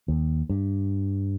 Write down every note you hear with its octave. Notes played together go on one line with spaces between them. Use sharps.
D#2
G2